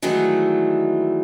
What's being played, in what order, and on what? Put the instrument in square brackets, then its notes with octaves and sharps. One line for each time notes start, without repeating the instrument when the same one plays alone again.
[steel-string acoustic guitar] D#3 E3 F#3 G#3 A3 D4